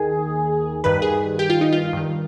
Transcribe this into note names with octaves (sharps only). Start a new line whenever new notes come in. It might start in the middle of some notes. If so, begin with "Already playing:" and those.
Already playing: D#2 D#3 G#4
G2 D#3 B4
G#4
G4
F4
D#4
F4
G2 D#3